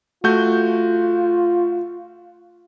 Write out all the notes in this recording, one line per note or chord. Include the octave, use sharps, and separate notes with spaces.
A3 F4 F#4 G6